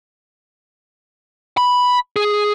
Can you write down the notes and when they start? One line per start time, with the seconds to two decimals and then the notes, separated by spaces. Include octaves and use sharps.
1.57 B5
2.16 G#4